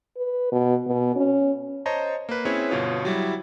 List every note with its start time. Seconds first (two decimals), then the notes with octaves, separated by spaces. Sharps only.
0.17 B4
0.52 B2
0.86 B2
1.16 C#4
1.86 C5 C#5 D#5 A5 A#5
2.29 A#3 B4
2.45 C4 C#4 E4 G#4 B4 C#5
2.70 G1 B2 F4 C#5 D#6
3.05 F#3 G3 E4